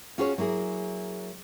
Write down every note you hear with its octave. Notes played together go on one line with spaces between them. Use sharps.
C#4 F4 F#4 G#4 B4 C#5
F#3 A#3 E4 G#4